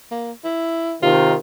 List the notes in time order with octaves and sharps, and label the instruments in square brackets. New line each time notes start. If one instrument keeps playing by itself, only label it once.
[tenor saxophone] A#3
E4
[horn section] C3 D#3 [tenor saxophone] F4